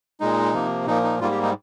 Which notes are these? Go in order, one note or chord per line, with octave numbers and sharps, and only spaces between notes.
A#2 G#3 D#4
C3 F3 A#3
A#2 F3 A#3 D#4
D#4
G#2 G3 A#3 F4
G4
D#4